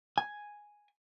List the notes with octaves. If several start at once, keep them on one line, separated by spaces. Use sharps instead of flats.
G#5